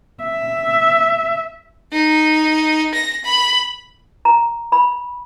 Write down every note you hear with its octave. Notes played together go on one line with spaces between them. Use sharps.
E5
D#4
A#6
B5
A#5
B5